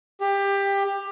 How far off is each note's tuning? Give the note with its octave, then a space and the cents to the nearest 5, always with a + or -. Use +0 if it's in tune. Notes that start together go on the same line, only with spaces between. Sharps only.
G4 +20